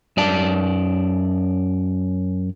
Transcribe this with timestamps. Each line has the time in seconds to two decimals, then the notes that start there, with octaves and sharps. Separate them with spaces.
0.17 F#2 D5 A5